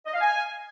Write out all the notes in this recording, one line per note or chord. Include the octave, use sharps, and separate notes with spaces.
D#5
F5
G#5